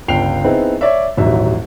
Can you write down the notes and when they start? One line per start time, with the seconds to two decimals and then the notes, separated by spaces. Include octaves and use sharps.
0.08 G1 C#2 G5 C7 F7
0.44 B3 C4 D#4 E4 G#4
0.81 C#5 D5 E5
1.17 D#1 A1 G#2 F#3 E5